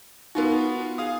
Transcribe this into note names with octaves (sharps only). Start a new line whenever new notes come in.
B3 D#4 F4 F#4 A#4
G#4 F5 D#6